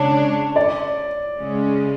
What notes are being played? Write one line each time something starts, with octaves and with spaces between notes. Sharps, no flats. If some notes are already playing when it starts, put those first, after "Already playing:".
Already playing: C#3 G#3 D4 C#5
D5
C#3 G#3 C#4